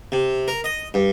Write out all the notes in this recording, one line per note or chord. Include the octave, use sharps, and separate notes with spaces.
C3
A#4
D#5
G2